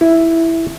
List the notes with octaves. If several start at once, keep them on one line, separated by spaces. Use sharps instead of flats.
E4